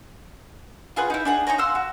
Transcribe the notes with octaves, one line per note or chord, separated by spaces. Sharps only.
F4 G#4 B4 F#5
D#4 E4
D4 G#4 F#5
D#4 G#4 C#5 A#5
F5 F#5 C6 E6
F#4